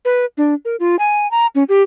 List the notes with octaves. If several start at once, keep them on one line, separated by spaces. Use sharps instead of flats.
B4
D4
A#4
F4
G#5
A#5
C#4
G4